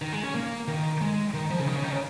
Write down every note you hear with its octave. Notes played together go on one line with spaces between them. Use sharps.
D#3
G#3
C#4
A#3
D#3
G#3
D#3
F3
C#3
D#3
C#3
D#3
C#3